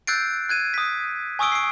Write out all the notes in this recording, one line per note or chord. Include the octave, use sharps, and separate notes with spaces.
E6 F#6 G6 A6 C7 D7
F#6 G#6 D#7
D#6 B6
G#5 C#6 D#6 E6 D7 G7
C7 D7